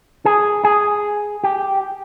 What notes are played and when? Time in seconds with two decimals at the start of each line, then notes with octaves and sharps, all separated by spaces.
0.25 G#4
0.65 G#4
1.44 G4